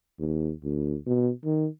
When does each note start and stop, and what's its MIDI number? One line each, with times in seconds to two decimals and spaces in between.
0.19 0.52 39
0.64 0.97 38
1.07 1.31 47
1.44 1.67 51